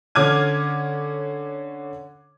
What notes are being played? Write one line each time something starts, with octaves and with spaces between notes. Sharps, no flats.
D3 C#4 D6 F6 G#6 D#7